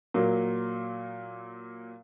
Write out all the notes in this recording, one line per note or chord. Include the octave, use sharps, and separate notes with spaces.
A#2 F#3 A#3